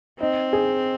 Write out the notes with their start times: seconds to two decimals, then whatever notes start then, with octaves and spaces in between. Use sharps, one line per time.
0.20 C4 D#4
0.53 G#4